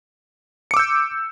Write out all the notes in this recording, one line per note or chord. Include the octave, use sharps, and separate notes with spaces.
D6 E6 G6 C#7